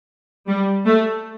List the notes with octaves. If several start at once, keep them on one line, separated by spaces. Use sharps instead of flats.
G3
A3